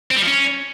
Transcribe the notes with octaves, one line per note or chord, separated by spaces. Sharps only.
C4
G3
F3
C#4